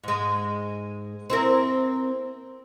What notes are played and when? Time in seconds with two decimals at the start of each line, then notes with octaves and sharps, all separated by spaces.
0.04 G#2 G#3
1.30 C4 E4 A#4